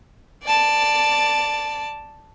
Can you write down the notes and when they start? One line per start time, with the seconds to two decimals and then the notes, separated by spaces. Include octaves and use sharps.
0.44 D5 A5